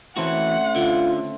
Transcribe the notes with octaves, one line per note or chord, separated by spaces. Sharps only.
E3 A3 C4 C#4 F#4 F#5
D3 F4